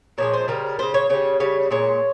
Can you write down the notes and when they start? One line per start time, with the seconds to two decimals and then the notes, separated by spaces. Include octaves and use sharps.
0.18 A#2 F3 G#3 C#5
0.33 C5
0.48 C#3 G3 A#4
0.79 G3 C5
0.82 C#3
0.94 C#5
1.10 C#3 G3 C#5
1.40 C#3 G3 C#5
1.70 A#2 G#3 C#5